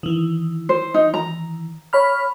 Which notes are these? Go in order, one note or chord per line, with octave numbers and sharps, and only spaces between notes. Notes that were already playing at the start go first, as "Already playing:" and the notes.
D#3 E3
C5
D#4
A#5
C#5 B5 F6